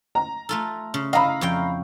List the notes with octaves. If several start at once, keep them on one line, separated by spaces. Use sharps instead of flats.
A#5
A3 F4 A4
C#3
E4 D#5 F5 A#5 B5
F2 C#5 G5